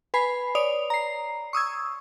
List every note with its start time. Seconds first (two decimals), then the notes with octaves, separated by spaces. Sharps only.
0.14 B4 G#5 B5 C7
0.55 C#5 D5 D#6 F7
0.90 A#5 C7
1.53 C#6 D#6 E6 G#6